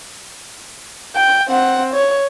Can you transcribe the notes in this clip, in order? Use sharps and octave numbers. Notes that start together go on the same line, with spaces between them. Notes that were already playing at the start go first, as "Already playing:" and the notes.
G5
C4 F#5
C#5